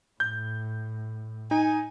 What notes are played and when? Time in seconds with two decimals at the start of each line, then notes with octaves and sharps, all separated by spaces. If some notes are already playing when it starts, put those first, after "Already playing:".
0.20 A2 G6
1.51 D#4 G#5